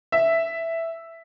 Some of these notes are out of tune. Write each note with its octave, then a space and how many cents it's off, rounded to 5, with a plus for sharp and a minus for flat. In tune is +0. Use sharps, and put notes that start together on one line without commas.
E5 +5